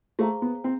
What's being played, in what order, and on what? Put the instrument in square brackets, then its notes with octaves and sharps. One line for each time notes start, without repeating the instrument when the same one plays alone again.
[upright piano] A3 [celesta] G#4 C5 F5 A#5
[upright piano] B3
C4